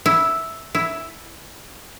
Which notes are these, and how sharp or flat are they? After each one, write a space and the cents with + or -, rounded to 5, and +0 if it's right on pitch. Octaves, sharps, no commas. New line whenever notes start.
E4 -5
E4 +0